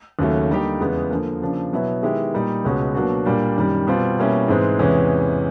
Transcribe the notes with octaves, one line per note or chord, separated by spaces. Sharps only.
D#2 C#3 F#3 A3
D3 G3 A#3 D#4 G4
E2 C#3 E3 G#3 B3
D3 F3 A#3
C#3 F3 A#3 D4
B2 F#3 B3 E4
D#3 G#3 B3 E4 G4
A#2 G3 A#3 D#4
C#2 B2 G#3 C#4 F#4
B2 F#3 A#3 D4 F#4
A#2 G3 A#3 D4
F#2 D#3 G3
B2 G3 C4 F4
B2 G3 A#3 C#4 E4
G#2 E3 G#3 C4
E2 C3 E3 G#3 C#4